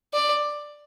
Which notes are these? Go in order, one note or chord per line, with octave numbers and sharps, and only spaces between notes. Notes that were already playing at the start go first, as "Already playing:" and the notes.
D5